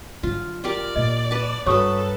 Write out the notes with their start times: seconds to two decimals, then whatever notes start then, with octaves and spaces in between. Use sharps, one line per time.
0.23 D3 F#3 F4
0.64 F4 G4 A#4 D5
0.96 A#2 D#5
1.31 B4 A5
1.66 G2 F#3 A4 B4 C#5 B5 C#6 D#6